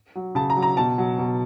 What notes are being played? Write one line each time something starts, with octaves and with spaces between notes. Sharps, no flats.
F#3
C#3 A5
A#5
F#3
A#5
B2 A5
F#3
B2